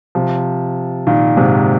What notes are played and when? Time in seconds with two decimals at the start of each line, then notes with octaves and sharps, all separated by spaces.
0.15 C3 F3
1.07 A#2 D#3
1.37 G#2 C3